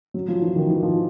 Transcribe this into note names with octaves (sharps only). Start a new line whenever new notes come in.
F#3
F3
E3
D#3
E3
F3